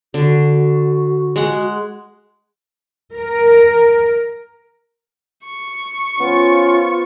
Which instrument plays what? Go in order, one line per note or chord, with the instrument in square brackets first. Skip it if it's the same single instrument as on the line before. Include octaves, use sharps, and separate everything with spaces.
[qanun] D3 [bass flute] F#4
[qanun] G#3 F#5
[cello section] A#4
[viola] C#6
[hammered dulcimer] B3 C5 [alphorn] C#4 [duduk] F4